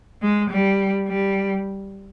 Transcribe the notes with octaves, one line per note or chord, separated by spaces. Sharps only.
G#3
G3
G3